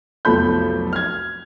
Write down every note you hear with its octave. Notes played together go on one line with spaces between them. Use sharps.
F1 B1 F2 A4 B5 G6
F6 G#6